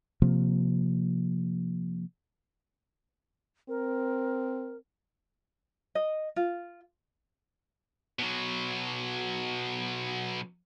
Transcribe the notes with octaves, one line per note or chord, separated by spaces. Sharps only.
C3 F3 A#3
C4 A#4
D#5
F4
B2 F#3